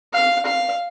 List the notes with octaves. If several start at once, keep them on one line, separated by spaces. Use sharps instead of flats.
F5
F5